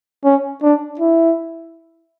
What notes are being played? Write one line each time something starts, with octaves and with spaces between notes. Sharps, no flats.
C#4
D4
E4